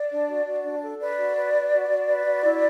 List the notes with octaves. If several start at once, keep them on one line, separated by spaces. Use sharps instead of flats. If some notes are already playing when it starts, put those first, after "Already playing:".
Already playing: D5
D4
F#4
F#4
D4
A4
B4 D5
F#4
B4
B4
F#4
F#4
B4
F#4
E4